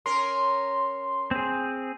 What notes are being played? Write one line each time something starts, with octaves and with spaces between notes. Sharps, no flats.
C#4 A#4 C6
C4 G#4